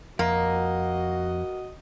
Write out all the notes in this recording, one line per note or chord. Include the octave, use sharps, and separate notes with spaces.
F2 A#3 F#4 D#5